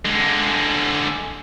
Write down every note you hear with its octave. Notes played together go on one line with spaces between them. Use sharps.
D3 G#3